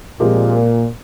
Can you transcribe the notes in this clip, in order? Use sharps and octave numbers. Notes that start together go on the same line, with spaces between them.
A#2 F3 G#3 C4 G4 A#4